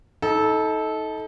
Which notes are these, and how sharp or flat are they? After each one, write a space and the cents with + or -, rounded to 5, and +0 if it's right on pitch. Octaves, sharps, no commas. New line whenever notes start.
D#4 +30 A4 -15